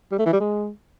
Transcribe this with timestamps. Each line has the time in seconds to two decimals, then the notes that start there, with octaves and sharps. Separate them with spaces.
0.12 G3
0.19 A3
0.26 E3
0.33 G3
0.40 G#3